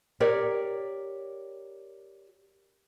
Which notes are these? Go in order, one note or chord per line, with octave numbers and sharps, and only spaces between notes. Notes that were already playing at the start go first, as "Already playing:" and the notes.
G4 A#4 C#5 D5